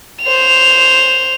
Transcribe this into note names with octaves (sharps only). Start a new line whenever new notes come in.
C5 F7